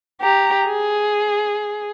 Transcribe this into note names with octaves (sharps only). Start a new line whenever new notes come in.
G4 A#5
G#4